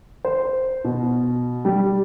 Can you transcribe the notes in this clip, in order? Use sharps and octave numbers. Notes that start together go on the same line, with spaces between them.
C5
B2
G3